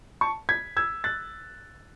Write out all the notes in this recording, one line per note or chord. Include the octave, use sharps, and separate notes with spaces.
A5 C#6
G#6 B6
E6 G#6
F#6 A6